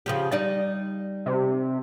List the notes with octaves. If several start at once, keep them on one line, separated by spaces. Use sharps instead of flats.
C#3 F3 G4
G3 D#4 D5
C3